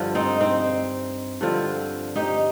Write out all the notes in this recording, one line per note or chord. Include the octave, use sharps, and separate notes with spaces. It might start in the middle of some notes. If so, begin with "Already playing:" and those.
Already playing: G2 D3 F3
C4 D#4
C4 D#4
G2 D3 F3 C4
D#4 G4